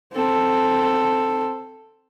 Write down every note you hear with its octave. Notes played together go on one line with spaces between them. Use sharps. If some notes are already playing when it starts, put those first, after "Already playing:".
C4 A4